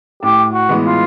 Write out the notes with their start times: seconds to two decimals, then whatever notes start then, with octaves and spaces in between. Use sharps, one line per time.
0.23 A2 G4
0.54 F#4
0.69 E3 G#3 B3
0.85 F4